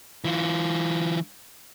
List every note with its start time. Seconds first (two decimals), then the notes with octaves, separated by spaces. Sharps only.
0.25 E3 F4